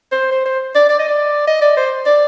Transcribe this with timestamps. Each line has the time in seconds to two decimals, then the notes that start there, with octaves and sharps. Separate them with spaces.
0.12 C5
0.31 C5
0.45 C5
0.75 D5
0.89 D5
0.99 D#5
1.08 D5
1.47 D#5
1.61 D5
1.77 C5
2.06 D5